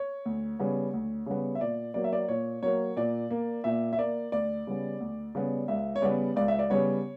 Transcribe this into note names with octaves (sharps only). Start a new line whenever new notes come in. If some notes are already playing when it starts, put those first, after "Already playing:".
Already playing: C#5
D2
C#3 G3 B3
D2
C#3 G3 B3
E5
A#2 D5
F#3 A#3 D5
E5
D5
A#2 C#5
F#3 A#3 C#5
A#2 D5
A#3
A#2 E5
E5
A#3 D5
D2 D5
C#3 G3 B3
D2
C#3 G3 B3
C#2 E5
C#5
C#3 G3 B3 D5
C#2 D5
E5
D5
C#3 G3 B3 C#5